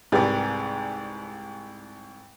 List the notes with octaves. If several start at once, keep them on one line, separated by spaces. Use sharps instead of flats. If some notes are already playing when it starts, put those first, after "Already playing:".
C2 G#2 G4 B4 D5